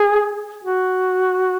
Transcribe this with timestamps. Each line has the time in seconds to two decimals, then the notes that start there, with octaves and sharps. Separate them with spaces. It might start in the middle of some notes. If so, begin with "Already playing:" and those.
Already playing: G#4
0.64 F#4